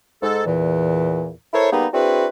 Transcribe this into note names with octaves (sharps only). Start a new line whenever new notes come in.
G#2 A4
E2 A#2 E3
E4 A4 A#4 C5 C#5
G3 A#3 B3 D#4 G#4
C4 D4 E4 F#4 G#4 B4